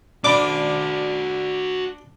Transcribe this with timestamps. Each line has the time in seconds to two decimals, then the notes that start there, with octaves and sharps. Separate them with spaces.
0.24 D4 F#4 C5 D5 B5 D6